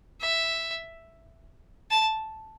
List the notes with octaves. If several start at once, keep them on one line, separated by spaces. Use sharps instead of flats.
E5
A5